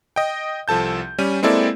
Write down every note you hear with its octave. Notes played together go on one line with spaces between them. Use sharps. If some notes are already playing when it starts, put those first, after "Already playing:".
D#5 G5
C2 F3 A4 A5 G6
G3 C#4 D#7
G#3 A#3 C4 E4 A4 D5